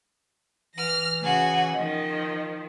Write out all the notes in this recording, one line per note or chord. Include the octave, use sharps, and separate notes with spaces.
E3 F6 A#6
C#3 F#4 G#5
D#3 F3 D#5